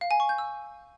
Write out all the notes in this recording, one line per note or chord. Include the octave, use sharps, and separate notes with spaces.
F5
G#5
C#6
G6
E6